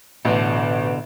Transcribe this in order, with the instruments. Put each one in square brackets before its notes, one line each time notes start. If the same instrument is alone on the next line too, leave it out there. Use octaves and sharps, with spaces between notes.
[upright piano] A1 [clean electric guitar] B2 D3